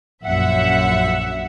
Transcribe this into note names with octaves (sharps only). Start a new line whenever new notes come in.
A#1 F#2 E5 F#5